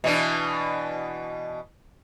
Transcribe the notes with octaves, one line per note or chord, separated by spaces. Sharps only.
B2 E3 D4